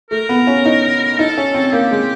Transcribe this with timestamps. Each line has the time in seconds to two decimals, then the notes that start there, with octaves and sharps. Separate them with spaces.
0.10 A3 A#4
0.29 B3
0.47 C#4
0.65 D#4
1.19 D#4 A4
1.38 C#4
1.54 C4
1.73 A#3 G4
1.91 G#3